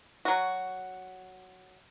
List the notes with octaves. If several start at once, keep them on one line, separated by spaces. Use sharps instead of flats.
F#3 F#4